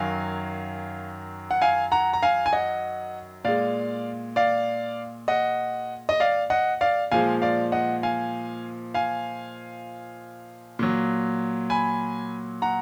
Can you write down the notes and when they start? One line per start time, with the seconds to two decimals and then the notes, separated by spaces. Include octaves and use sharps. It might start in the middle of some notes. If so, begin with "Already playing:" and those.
Already playing: F#2 D#3 F#3 F5 G#5
1.51 F#5
1.62 F5 G#5
1.92 F#5 A#5
2.13 A#5
2.22 F5 G#5
2.46 G#5
2.53 D#5 F#5
3.45 A#2 G#3 D5 F5
4.36 D5 F5
5.28 D#5 F#5
6.09 D#5
6.20 D5 F5
6.50 D#5 F#5
6.81 D5 F5
7.11 A#2 F3 G#3 F5 G#5
7.42 D5 F5
7.72 D#5 F#5
8.03 F5 G#5
8.94 F5 G#5
10.79 A#2 F#3
11.70 G#5 B5
12.62 F#5 A#5